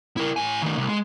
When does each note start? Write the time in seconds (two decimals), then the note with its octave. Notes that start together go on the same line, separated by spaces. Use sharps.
0.17 E4 A#4
0.36 A2 G#5
0.62 D#3 A3
0.78 C2
0.89 G#3